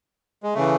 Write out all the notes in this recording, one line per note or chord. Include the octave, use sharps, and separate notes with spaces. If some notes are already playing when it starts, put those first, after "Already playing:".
G#3
C#3 E3 A3